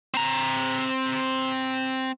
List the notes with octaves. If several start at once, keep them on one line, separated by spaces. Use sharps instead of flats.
C4 A#5